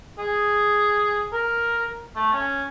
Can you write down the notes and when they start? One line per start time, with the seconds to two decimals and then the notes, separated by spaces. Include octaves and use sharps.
0.18 G#4
1.33 A#4
2.15 A3
2.33 C#4